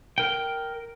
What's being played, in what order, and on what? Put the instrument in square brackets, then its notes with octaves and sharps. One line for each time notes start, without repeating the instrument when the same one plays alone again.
[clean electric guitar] A#4 G5